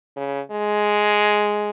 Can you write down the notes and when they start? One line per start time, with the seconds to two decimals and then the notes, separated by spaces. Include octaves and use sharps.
0.16 C#3
0.51 G#3